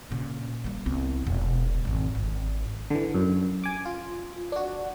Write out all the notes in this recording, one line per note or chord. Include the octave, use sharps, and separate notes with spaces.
A#2 C#3
G3 A#3
C2 B3
E1 B2
G#1 F2
G#1
D3 E3
F#2
G#5 D6
F4
D4 F#4